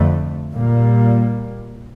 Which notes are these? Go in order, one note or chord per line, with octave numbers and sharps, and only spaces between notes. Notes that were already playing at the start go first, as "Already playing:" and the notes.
Already playing: F2 D3 A3
A#2 G3 A#3